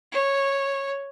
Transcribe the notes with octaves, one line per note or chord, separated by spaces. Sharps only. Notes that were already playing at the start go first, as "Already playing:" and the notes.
C#5